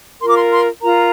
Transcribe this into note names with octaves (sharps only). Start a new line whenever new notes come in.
F4 A#4 C6
D6
C6
C6
F4 A#4 A#5